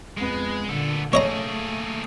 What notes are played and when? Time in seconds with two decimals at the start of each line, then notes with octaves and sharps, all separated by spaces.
0.18 F2 G#3 B3
0.69 A#2 D3 B3 A4
1.13 A3 A#3 G#4 C#5 D#5 A#5